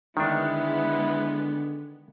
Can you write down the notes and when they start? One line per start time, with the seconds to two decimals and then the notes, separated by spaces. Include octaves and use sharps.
0.17 D3 D#3 G#3 B3 D4 E4